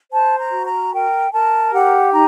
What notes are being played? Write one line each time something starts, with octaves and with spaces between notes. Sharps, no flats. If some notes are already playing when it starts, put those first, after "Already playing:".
C5 A5
A#5
F#4
A#5
A#4 G5
A#4 A5
G4 F#5
D#4 A#5